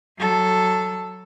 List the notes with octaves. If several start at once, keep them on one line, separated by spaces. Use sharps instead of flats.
F#3 A4